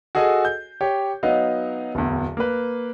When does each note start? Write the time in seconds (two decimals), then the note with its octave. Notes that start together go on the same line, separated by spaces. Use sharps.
0.15 F#4 G#4 A4 D#5 G#5
0.45 G6
0.81 G4 C#5
1.23 F#3 B3 D#4 D#5 F5
1.95 D1 E2
2.37 A#3 B4